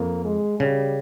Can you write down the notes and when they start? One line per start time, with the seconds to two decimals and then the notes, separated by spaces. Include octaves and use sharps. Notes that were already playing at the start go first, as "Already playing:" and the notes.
Already playing: F2 A#3
0.24 G#3
0.59 C#3 G3